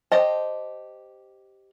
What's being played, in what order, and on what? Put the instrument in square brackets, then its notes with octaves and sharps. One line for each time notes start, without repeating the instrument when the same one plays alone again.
[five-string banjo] G4 C5 D#5 A5